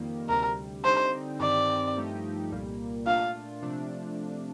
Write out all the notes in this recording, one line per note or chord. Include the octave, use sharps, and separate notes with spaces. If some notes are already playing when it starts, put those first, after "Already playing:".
Already playing: F2 D#3 G3 A#3
D2 C3 G3 A#4
D3 G3 C4 D#4 C5
G2 D#3 G3 C4 G4 D5
G2 F3 A3 D#4 G4
C2 A#2 G3 A#3
A#2 A3 D4 F4 F5
C3 F3 A3 D4